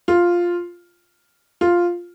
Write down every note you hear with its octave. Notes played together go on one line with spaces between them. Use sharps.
F4
F4